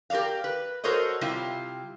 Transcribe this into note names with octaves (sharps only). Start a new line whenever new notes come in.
G4 A#4 B4 D5 F5
B4
F#4 A4 A#4 C5 C#5 D#5
C3 G3 E4 F4